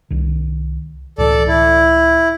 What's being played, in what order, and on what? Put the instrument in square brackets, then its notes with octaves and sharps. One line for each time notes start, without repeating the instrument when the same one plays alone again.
[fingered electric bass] C2 D#3
[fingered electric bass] C#2 A2 E3 [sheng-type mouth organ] A4 D5
[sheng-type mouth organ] E4